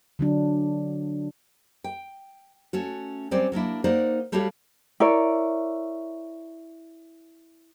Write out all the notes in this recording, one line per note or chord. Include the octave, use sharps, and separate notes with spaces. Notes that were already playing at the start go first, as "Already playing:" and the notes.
D3 F#3 D4
G5
A3 C#4 F#4
F#3 G3 C4 C#4 C5 D5
F#3 A#3 D4 E4
A#3 D#4 C5 D5 F#5
G3 A3 F#4 G4 C#5 F5
E4 A#4 C#5 D5